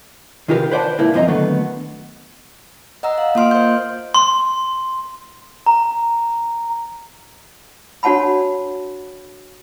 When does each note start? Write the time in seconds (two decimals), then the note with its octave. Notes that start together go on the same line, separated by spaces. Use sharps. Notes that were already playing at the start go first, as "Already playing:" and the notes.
0.48 C3 D#3 F4 G4 A#4 B4
0.72 B4 C5 D5 F#5 A5
0.98 C#2 A#2 A#3 E4
1.13 C#2 G2 F3 C4 D#5 A#5
1.28 D3 D#3 F#3 A3 B3
3.03 D#5 F#5 A#5 E6
3.18 F5
3.35 A#3 F4 D#5 C6 F6 D7
3.51 C5 G6
4.14 C6
5.66 A#5
8.03 D4 F#4 C#5 F#5 A5 B5